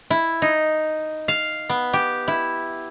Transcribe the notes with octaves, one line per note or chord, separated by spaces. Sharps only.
E4
D#4
F5
B3
G4
E4